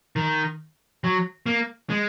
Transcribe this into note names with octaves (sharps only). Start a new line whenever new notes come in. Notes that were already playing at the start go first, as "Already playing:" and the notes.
D#3
F#3
A#3
G#3